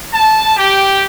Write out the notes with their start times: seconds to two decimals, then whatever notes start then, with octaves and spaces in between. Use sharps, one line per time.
0.12 A5
0.56 G4